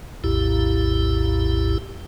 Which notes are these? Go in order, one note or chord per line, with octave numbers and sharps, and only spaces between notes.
A#1 E2 A2 E4 G4